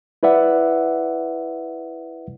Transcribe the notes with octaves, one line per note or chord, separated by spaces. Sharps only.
E4 B4 D5 E5 F#5